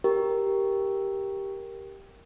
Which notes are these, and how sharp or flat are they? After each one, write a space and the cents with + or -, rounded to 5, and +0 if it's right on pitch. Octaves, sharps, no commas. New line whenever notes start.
G4 +0 A#4 +0